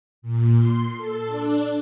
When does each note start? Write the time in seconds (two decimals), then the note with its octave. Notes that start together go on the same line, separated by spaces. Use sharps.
0.22 A#2
0.55 C6
0.96 A4
1.26 D4